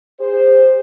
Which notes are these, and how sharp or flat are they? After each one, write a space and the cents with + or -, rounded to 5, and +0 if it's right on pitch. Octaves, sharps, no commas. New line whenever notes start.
G#4 -45 C5 +0